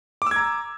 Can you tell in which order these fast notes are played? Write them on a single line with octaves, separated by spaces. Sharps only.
D6 E6 G#6 A#5